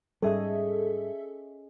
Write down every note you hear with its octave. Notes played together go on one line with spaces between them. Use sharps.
G#2 G3 C#4 G#4 A4 D#5 E5